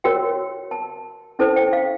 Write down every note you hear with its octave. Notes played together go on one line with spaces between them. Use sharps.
F#4 A#4 C#5 G5
A5
C#4 E4 A4 C5 A5
G5
F5